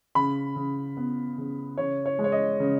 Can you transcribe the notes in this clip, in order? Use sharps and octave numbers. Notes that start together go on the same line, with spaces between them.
C#3 B5
C#3
B3
C#3
C#3 C#5
C#5
G#3
C#5
D#5
C#3